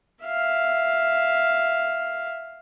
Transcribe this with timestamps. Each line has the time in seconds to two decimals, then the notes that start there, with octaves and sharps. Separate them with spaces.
0.24 E5 F5